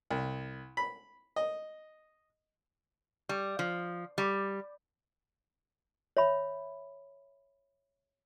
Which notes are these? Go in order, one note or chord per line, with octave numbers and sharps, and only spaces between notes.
C2
B5
D#5
G3
F3
G3
C#5 E5 B5